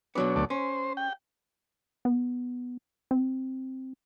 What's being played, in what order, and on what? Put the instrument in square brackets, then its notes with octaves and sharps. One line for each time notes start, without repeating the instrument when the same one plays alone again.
[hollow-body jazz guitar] B2 F#3 B3 [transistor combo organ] D4
[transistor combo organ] D2 A3 D5
[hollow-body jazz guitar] C#4 [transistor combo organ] C5
[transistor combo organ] G5
[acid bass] B3
C4